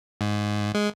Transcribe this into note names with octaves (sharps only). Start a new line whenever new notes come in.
G#2
G#3